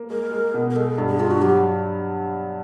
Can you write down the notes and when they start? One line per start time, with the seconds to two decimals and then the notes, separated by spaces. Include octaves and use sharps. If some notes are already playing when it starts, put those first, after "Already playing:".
Already playing: A#3
0.10 G#3 A#4
0.32 G#3
0.54 B2
0.70 A#4
0.76 G#3 A4
0.98 G2
1.08 G#4
1.19 G2 F4
1.31 F#4
1.41 F#3 G4